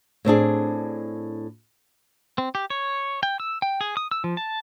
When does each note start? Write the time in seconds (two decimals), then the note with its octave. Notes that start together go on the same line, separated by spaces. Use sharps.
0.25 A2 C4 D4 G#4
2.38 C4
2.55 G4
2.70 C#5
3.23 G5
3.40 E6
3.62 G5
3.81 G#4
3.97 D#6
4.11 E6
4.24 F3
4.37 A5